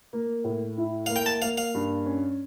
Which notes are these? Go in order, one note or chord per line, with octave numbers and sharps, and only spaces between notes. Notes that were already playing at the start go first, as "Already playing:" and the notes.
A#3
A2
E4
A#3 F5
G5
A5
A#3 F5
F5
G2
C#4